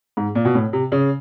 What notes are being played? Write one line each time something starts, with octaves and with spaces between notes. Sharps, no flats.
G#2
A#2
B2
A2
C3
C#3